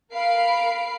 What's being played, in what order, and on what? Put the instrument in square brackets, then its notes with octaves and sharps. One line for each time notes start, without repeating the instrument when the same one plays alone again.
[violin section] A#4 F5 B5 C7 D7